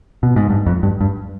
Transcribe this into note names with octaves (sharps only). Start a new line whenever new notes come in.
B2
G#2
G2
F2
G2
G2